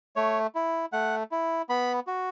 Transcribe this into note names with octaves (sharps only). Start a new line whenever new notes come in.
A3 C#5
E4
A3 F#5
E4
B3 B5
F#4